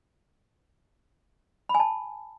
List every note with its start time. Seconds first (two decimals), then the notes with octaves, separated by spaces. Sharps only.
1.69 B5
1.75 G#5
1.80 A5